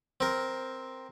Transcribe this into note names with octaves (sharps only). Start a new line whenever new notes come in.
C4 A#4